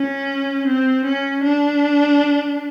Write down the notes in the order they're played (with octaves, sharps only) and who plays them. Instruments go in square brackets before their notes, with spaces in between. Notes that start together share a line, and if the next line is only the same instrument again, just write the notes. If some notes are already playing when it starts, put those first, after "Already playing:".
Already playing: [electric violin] C#4
C4
C#4
D4